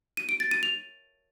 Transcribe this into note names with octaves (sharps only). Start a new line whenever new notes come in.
D#7
D7
A6
D#7
F7